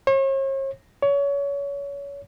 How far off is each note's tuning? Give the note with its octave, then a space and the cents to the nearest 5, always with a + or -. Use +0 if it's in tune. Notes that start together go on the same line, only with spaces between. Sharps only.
C#5 -45
C#5 +25